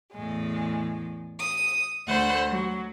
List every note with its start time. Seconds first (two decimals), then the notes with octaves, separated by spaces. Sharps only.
0.13 E2 A2 G#3
1.38 D#6
2.06 D2 A3 C5 F#5 B5
2.49 F#3